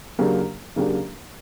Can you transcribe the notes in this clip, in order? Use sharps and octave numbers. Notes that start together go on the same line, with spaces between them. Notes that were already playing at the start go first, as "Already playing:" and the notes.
C#3 F#3 A#3 D4 G4
C#3 F#3 A#3 D4 G4